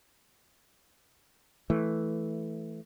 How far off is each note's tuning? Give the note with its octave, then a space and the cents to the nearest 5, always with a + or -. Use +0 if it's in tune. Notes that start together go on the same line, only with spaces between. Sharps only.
E3 +0 A3 +0